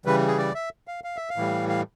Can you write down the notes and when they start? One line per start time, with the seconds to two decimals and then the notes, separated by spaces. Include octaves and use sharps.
0.05 C#3 E3 G3 B4
0.28 G#4
0.38 D5
0.55 E5
0.88 F5
1.04 F5
1.17 E5
1.30 F5
1.36 A2 E3 G3
1.69 F5